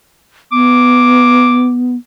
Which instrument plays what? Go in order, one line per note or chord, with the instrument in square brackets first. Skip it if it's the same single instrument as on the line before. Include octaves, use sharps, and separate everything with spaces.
[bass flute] B3 [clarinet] D6